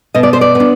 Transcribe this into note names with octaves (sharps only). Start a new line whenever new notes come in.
B2 D#5
D5
C5
D5
B3
D4